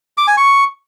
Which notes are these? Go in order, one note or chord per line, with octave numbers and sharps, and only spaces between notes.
D6
G#5
C#6